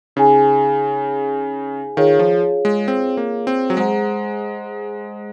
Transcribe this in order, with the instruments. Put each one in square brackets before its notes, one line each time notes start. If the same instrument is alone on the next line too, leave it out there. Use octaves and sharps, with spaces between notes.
[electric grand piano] C#3 [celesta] D#4 G#4 C#5 G#5
[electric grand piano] D#3 [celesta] F4 G#4 C#5 F5
[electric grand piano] F3
G#3
C4
A#3
C4
F#3
[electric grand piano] G#3 [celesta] G#4 C5 F#5 A#5